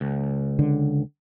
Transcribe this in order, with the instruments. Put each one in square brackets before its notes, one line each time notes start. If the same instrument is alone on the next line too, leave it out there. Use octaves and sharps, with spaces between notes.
[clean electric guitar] C#2
[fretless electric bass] D3